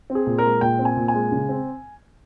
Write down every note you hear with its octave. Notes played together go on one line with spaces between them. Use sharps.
C4
G#4
A#2
A#4
G#3
A#2 G5
C4
G#5
A#2
G#5
G#3
C#3
C4